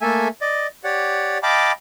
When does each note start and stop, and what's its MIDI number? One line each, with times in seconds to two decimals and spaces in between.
0.01 0.28 57
0.01 0.28 58
0.01 0.28 69
0.01 0.28 76
0.01 0.28 80
0.41 0.67 74
0.41 0.67 75
0.84 1.38 67
0.84 1.38 73
0.84 1.38 74
0.84 1.38 78
1.43 1.72 75
1.43 1.72 77
1.43 1.72 79
1.43 1.72 81
1.43 1.72 83
1.43 1.72 86